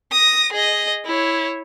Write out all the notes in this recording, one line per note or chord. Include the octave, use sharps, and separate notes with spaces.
D#6 A#6
G#4 D#5
E4 C#5